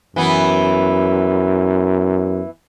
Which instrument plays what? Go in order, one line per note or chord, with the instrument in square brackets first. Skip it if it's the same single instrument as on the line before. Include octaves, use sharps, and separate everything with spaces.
[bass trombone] F#2 [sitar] E3 B3